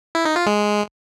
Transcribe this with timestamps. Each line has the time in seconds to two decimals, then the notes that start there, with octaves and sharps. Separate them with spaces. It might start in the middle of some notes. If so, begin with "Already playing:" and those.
0.15 E4
0.25 D#4
0.36 F4
0.46 G#3